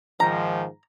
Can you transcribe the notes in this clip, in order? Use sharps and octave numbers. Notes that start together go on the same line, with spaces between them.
G#2 D#3 F3 A#5